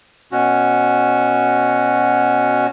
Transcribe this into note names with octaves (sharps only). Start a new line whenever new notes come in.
B2 C#4 F#4